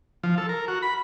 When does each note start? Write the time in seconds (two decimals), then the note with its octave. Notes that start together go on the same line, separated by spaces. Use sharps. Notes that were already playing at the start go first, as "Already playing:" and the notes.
0.24 F3
0.38 A4
0.49 A#4
0.68 F#4
0.82 B5